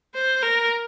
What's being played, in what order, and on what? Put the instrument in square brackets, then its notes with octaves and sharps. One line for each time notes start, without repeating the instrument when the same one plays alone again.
[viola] C5
A#4